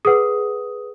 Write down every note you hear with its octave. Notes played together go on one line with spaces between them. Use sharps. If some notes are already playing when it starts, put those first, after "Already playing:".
G#4 B4 F#5 D#6